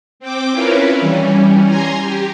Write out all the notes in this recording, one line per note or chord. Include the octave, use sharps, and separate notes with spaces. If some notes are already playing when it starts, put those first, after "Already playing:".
C4 G5 D6
C#4 E4 F4 A#4 B4
E3 G3 C#4
G#5 A#5 C6
G4